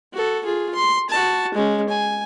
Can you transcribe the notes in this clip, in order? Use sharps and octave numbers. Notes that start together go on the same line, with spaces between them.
F#4 A4
F4 G#4
C6
F#4 A5
G#3 C#4
G#5